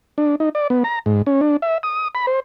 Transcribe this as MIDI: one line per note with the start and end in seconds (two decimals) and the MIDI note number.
0.18 0.36 62
0.40 0.49 63
0.55 0.67 74
0.70 0.83 59
0.84 0.99 82
1.06 1.22 44
1.26 1.41 61
1.41 1.57 62
1.62 1.78 76
1.83 2.08 87
2.15 2.26 83
2.27 2.40 72